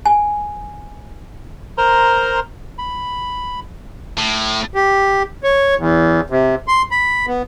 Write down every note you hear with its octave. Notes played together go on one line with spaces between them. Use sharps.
G#5
A#4 C5 A#5 C6
B5
A2
G4
C#5
E2
C3
C6
B5
B3